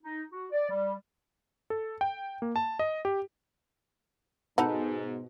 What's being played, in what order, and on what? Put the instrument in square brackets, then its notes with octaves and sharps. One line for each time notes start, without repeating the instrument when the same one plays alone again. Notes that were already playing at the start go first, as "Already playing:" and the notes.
[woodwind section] D#4
F#4
D5
G3
[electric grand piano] A4
G5
A#3
A5
D#5
G4
[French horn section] G#2 [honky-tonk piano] B2 [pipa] D#4 A4 B4 [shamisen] F#5